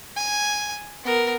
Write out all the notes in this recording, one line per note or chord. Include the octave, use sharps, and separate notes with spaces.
G#5
B3 A#4